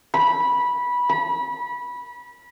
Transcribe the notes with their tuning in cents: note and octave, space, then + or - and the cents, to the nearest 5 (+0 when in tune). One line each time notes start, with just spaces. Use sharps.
B5 -15
B5 -30